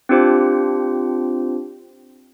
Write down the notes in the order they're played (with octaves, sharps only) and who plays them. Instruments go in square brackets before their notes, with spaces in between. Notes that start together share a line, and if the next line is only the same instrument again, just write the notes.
[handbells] C4 D4 F4 G4 C5